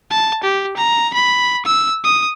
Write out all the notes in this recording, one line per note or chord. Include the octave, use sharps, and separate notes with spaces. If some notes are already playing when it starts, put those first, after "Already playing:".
A5
G4
A#5
B5
E6
D#6